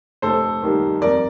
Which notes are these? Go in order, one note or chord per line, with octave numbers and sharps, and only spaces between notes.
F1 A4 C5
D#2 D#3 G3
F2 A#4 D5